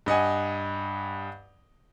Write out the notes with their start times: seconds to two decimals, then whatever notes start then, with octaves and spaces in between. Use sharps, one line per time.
0.06 G2 D#5 F#5 G#5